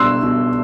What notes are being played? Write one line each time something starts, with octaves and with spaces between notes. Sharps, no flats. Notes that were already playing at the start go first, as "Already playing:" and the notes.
Already playing: B2 G3 D4 C6 E6 F#6
B2